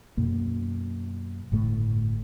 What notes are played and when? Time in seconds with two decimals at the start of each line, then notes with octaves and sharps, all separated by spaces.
0.17 F#2 B2 A#3
1.52 G1 A2 A3